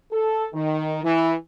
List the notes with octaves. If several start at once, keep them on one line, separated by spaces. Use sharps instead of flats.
A4
D#3
E3